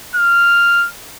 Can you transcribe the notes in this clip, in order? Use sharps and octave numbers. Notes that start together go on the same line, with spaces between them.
F6